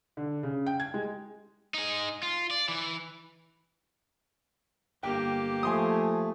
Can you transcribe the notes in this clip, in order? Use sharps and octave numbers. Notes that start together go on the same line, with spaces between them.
D3
C#3
G5
G#6
G#3
D#4 G#4
F4
D5
E3
G1 A#3 G4 G5
F3 A3 G#5 C6 D#6